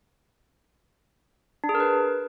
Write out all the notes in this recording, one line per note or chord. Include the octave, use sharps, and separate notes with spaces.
D4
G#4
A#4
B4